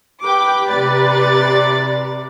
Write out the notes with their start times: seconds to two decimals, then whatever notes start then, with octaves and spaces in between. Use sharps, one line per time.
0.24 G4 B4 G5 D6
0.70 C3 D5 A6